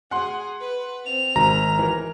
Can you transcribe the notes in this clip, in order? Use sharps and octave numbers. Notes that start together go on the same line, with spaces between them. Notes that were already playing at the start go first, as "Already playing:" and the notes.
G#4 F#5 C6
B4
C4 F7
G#1 A#5
E3 A#4